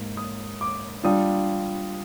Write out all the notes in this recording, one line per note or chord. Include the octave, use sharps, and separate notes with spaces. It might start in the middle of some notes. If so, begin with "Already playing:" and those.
Already playing: G#2 A#3
D#6
D6
G3 D4 F4 D#6